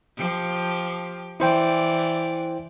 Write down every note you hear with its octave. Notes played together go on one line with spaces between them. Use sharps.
F3 G4
E3 E4 C5 D5 G5